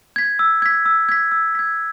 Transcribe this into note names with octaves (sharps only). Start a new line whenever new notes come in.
G#6 B6
E6
G#6 B6
E6
G#6 B6
E6
G#6 B6